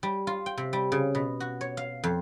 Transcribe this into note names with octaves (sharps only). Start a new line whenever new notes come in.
G3
F4
G5
C3
G3
C#3
B2
F#4
C#5
F5
F2